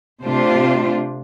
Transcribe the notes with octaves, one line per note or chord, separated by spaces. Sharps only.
C3 A3 D4 F4 C5